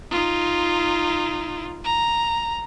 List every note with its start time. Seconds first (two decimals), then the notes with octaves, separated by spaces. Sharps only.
0.11 D#4 F4
1.84 A#5